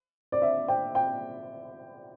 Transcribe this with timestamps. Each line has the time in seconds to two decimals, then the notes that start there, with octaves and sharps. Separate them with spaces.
0.32 D5
0.42 E5
0.68 G5
0.95 G5